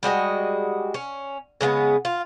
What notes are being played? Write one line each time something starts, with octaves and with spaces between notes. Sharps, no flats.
G3 G#3 F#4 D#5
C#4
C#3 G#3 A3 B3
F4